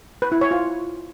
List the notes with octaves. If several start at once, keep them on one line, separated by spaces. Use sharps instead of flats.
B4
E4
C#5
F4